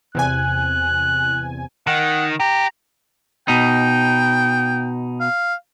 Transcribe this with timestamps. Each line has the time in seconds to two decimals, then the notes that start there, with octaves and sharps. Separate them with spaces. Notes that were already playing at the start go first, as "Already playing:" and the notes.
0.15 E2 C3 G#5 F#6
1.87 D#3 F#5
2.40 G4 A#5
3.48 B2 D#4 G5
5.21 F5